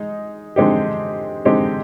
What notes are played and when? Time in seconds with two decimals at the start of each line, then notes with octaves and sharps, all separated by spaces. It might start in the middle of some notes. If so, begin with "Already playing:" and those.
Already playing: G#3 D#4
0.56 D3 G#3 C4 D#4 G4
1.45 D3 G#3 C4 D#4 G4